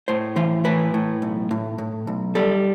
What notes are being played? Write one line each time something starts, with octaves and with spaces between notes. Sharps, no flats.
A2 C5
E3 C5
A2 B4
A2
B1
A2
A2
B1
G3 A4